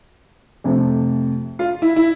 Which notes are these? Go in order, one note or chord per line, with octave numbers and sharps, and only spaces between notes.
F2 C3 F3 A3
F4
E4
E4